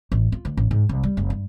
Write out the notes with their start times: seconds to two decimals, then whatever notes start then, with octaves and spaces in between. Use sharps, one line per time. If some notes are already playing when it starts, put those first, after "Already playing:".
0.12 A1
0.32 F4
0.45 D2
0.57 A1
0.71 G#2
0.89 C2
1.03 G3
1.17 F#1
1.30 G2